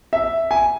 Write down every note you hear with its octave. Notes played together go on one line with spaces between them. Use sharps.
E5
G#5